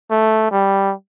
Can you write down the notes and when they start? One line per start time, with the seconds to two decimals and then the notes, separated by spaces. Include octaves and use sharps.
0.11 A3
0.51 G3